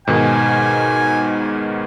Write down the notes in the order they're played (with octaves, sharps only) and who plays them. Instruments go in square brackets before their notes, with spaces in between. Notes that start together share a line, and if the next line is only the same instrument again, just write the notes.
[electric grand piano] G#2 B2 D#3 [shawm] G#5